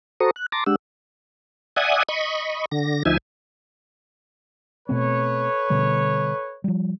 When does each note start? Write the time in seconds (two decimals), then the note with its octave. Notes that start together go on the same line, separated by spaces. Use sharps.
0.20 F#4 A4 C5 A#5 C#6 D#6
0.36 F#6
0.52 A5 A#5 C6 D6 A6 A#6
0.66 G#3 D4 G4 F#5 E6
1.76 D5 E5 F#5 G#5 D#6
2.09 D#5 B5 C#6
2.71 D3 A#6
3.05 D2 F3 D#4 E5 G#5
4.89 B2 A3 C4 A4 B4 C#5
5.70 B2 D3 G3
6.64 F3 G3